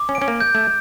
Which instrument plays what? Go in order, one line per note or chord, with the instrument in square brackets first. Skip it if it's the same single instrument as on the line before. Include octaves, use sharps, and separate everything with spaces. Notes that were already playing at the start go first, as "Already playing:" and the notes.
Already playing: [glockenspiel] D6
[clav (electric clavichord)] C#4
[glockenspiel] D7
[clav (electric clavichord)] C#4
A#3
[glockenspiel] G6
[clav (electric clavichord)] A3